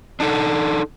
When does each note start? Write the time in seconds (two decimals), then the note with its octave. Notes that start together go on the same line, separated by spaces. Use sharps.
0.20 D4 D#4 A4